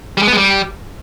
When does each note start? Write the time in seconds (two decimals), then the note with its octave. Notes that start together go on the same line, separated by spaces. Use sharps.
0.17 G3
0.22 G#3
0.27 B3
0.32 G#3
0.37 G3